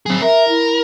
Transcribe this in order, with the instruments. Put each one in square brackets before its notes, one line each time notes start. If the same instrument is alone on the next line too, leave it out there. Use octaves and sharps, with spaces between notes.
[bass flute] F#3 [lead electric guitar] C4 G#4
[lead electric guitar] A#4 [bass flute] E5
[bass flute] E4